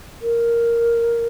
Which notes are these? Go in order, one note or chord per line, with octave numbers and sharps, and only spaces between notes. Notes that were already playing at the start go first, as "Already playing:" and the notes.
A#4